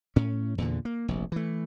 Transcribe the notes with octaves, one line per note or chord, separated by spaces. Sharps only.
A2 C#4
E2 A#2 D3
A#3
F1 A#1
E3 A3